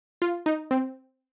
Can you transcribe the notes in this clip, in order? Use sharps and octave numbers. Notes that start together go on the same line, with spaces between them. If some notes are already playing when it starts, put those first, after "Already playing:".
F4
D#4
C4